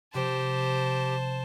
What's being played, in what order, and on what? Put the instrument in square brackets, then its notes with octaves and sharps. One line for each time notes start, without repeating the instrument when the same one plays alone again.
[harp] C3 F3 [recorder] G4 [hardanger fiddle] C5 A5